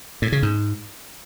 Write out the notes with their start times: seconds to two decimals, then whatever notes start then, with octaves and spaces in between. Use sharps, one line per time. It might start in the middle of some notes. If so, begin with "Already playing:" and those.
0.22 A2
0.32 C#3
0.43 G#2